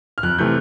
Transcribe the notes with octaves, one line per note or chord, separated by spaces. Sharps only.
F6
F2 F#6
C3 E3 A3 G6